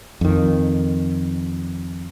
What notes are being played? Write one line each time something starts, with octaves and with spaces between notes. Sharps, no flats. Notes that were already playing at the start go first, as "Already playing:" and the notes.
F2 D#3